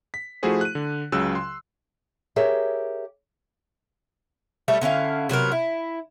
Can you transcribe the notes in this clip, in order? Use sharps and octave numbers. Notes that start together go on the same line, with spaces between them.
B6
F3 A3 E4 F#4 G#4 C5
F#6 D#7
D3
C#2 C#3 F#3 E6 F#6
C6
G4 G#4 A#4 C#5 E5
G3 A3 C#5 E5
D3 C#4 E4 F5
C3 F#3 B3 A#4
E4